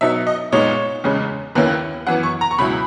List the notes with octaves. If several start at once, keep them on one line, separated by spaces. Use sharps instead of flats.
B2 F#3 B3 D#4 E5
D#5
A#2 G#3 B3 D#4 C#5
E2 C#3 G#3 C#4
D#2 D#3 A#3 C#4 E4 B4
F#2 E3 B3 F#5
C#6
A#5
C#6
C#2 B2 F#3 C#4 E4 B5